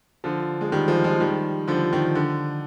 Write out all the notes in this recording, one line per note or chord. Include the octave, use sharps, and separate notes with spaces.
D3 F3
G#3
D#3 G3
F3 G#3
F3 G#3
D#3 G3
D3 F3
D#3
D3